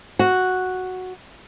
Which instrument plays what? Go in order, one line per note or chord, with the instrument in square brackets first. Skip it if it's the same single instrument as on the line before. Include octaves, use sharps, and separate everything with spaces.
[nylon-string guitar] F#4